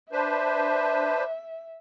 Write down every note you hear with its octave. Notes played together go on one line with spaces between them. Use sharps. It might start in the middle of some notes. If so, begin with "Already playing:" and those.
D4 B4 C5 E5